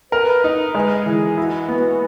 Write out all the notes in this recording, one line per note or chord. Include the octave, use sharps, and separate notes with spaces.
A#4 B4
D#4
G#3 G#4
E3 G#4
E4 F#4
B3 F#4